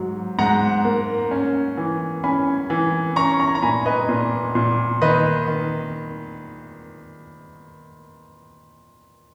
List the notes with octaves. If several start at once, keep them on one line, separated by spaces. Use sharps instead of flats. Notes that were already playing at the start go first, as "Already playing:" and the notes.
Already playing: G#2 F#3
G#2 F#5 A#5
A#3
C#4
E3
C#4 G#5 B5
E3
C#4 A#5 C#6
A#5 C#6
A#5
A#2 G#5 B5
B4 D#5
A#2
A#2
D#3 B4 D#5
D#3